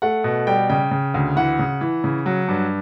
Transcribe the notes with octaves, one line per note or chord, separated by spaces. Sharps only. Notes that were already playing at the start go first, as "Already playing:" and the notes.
A3 F#5
B2
G3 G5
C#3 G5
C#3
D2
E3 F#5
C#3
E3
C#3
F#3
G2